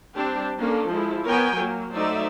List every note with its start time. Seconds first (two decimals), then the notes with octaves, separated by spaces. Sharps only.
0.15 G3 C4 D4 G4
0.58 A#3 C#4 D4 A4
0.89 F3 G#3 E4
1.24 B3 A#4 C#5 G5 G#5
1.55 F#3 A#3
1.93 F#3 A3 D#4 C5 D5 E5